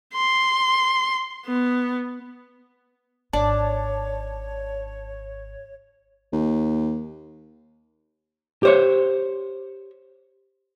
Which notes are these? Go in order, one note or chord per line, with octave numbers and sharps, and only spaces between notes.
C6
B3
G#1 D4 C#5 A5
D#2
G4 C5 C#5